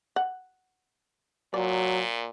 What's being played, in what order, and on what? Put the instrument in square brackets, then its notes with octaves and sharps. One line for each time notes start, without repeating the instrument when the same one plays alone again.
[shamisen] F#5
[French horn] A#2 [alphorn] F#3 [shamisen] D5